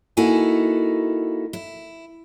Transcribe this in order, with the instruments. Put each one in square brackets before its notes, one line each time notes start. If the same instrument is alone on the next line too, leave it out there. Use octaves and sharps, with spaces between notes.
[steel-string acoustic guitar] A#3 D#4 E4 F#4 A4 G#5
E4